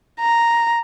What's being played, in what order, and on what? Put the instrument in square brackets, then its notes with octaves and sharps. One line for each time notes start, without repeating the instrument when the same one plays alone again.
[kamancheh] A#5